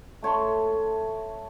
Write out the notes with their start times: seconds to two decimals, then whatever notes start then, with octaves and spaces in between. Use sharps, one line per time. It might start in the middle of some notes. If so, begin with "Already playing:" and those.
0.22 A3 C#5 A5 C6